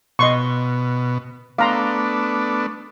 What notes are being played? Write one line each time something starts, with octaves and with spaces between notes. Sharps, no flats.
B2 D#5 C6 C#6
A3 B3 D4 F5 A#5 C6